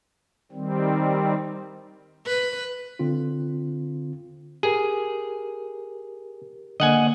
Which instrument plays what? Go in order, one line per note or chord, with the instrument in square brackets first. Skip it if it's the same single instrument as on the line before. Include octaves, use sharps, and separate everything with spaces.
[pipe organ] D#3 G3 C4
[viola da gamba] B4
[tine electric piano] D3 C4 F4
[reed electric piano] G4 A#4 [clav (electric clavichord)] G#4
[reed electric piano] D3 A#3 [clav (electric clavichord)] D#5 F#5 G#5